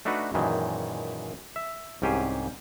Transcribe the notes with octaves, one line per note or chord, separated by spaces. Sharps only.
A3 D4 D#4 F#4 B4 F#5
F#2 A#2 D#3 E3 G#3
E5
C2 G#2 C#4 G4 C5 G#5